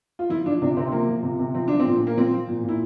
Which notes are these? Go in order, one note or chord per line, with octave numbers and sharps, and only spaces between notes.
F4
F3 E4
F3 D4
C3 D4
C3 C4
C4
F3 A#3
F3
C3
C3
F3 C4
F3 D4
C4
A#2
A#2
A#3
F3 C4
F3
A#2
A#2 E4